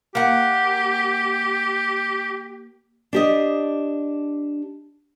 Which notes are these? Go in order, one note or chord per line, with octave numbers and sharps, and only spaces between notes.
A#3 G4 F#5
D4 G4 D#5